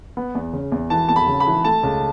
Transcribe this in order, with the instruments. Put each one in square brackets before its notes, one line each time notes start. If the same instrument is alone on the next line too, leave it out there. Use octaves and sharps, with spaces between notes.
[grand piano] B3
E2
C#3
E2
[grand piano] E3 [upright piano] A5
[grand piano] E2 [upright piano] A5
[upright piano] B5
[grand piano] C#3
[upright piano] B5
[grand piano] E3
[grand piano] A3 [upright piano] A5
[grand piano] C#2